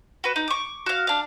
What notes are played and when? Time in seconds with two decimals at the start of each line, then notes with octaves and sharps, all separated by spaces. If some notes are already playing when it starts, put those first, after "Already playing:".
0.24 F#4 B4
0.36 D#4
0.48 C#6 D6
0.86 F#4 F5
1.07 D4 F5